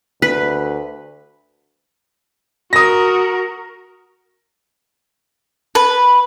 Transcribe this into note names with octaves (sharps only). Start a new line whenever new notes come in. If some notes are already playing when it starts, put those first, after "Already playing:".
D2 B4
F#4 A#4 D#6 A#6
B4